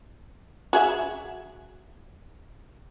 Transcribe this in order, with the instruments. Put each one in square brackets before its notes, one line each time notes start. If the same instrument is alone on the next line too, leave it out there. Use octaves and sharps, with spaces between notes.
[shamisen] F#4 G#4 E5